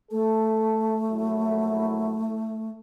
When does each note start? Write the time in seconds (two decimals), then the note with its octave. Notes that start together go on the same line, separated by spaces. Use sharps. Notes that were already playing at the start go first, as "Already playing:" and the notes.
0.12 A3 A4
1.10 A#1 F#3 E4